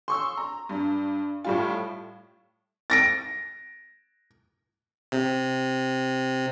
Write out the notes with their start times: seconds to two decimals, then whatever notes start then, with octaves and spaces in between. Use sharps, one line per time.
0.08 C6 C#6 E6
0.37 A#5
0.69 G2
1.45 A2 G3 F4
2.90 A6 A#6 D7
5.12 C3